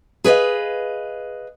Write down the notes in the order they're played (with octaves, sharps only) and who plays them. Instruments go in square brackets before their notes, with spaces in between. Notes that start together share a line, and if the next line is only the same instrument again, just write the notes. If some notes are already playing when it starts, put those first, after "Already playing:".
[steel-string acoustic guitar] G#4 B4 C#5 D#5 F5